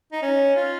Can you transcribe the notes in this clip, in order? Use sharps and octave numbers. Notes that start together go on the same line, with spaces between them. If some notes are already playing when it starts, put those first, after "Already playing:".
D#4
C#4
F4